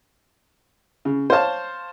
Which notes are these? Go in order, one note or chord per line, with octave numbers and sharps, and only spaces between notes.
C#3
C5 C#5 F5 A5